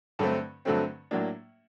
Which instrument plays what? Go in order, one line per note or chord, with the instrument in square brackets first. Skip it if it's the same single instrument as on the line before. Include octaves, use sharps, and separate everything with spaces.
[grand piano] G2 D3 F#3 A3 C4
G2 D3 F#3 A3 C4
A2 F#3 A#3 D4